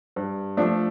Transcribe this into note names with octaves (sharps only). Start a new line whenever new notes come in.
G2
F3 A3 D4